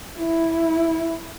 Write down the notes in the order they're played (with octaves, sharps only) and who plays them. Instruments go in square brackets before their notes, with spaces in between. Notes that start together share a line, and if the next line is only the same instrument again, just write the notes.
[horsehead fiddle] E4